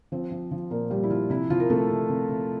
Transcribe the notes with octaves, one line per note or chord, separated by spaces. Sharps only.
F3 C4 C5
F3
F3
A#2 A#3 A#4
A#2 G3 G4
E4
F3 F4
C3 E4
F3 F4
A#4
C3 A3 A4
C3
C3
C3